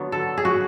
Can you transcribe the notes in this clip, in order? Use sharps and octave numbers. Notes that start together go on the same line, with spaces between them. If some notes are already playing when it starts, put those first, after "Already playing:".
Already playing: D3 F#3 B3
A4
G#4
F#4